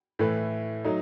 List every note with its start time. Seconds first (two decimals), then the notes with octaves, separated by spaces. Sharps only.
0.19 A2 E3 A3 E4 B4
0.85 F#3 A3 D#4